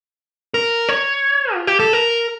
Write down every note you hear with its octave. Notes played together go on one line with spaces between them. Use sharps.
A#4
C#5
F4
G4
A4
A#4